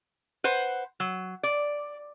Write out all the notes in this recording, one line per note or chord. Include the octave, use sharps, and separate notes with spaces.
B4 C5 F#5
F#3
D5